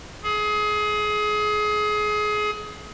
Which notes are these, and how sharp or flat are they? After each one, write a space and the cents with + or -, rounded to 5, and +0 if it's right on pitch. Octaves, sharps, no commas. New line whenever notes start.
G#4 +25